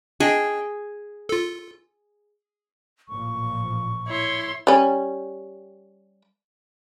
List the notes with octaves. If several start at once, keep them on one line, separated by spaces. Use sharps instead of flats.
D4 G#4 D#5 G5
F4 A4
A1 A#2 F3 C#6
E4 C#5 C6
G3 C#4